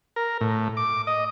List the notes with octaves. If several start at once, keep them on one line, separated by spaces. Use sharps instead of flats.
A#4
A2
D6
D#5